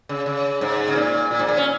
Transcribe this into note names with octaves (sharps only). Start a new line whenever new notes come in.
C#3
C#3
G#2
C#3
A#2
A#2
G#2
A#2
C#4